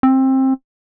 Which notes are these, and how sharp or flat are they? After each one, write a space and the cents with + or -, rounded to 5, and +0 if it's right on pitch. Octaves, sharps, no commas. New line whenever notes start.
C4 +20